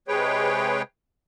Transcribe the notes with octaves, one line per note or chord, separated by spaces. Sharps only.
C3 G#3 G#4 B4 C#5 G5